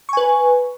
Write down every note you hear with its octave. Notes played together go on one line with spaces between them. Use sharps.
B4 G#5 C#6